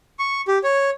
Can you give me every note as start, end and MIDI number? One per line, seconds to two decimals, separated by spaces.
0.19 0.41 85
0.48 0.58 67
0.64 0.90 73